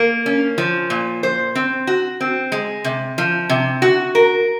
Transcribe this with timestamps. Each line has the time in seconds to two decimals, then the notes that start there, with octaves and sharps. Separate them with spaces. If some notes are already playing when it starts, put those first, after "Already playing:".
Already playing: A#3
0.26 C#4
0.58 F3
0.90 A#2
1.23 C5
1.55 C4
1.87 F#4
2.21 C4
2.52 G#3
2.84 C3
3.18 F3
3.49 C3
3.82 F#4
4.15 A#4